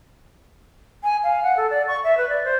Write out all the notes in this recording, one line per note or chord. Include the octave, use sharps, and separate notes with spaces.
G#5
F5
F#5
A4
D5
C#6
E5
B4
D5
C5